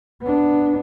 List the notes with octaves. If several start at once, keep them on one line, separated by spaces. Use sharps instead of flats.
B3 D4